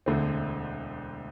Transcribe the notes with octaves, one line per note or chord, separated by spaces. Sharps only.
E1 D2 D3 A3 C4